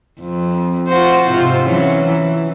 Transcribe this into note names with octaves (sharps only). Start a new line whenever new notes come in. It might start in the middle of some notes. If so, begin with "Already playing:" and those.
F2
F4 F#4 C5
G#2 C3 F4
E3 F#3 C#4
E3